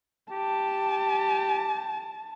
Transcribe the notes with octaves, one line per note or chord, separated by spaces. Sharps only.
G4 A5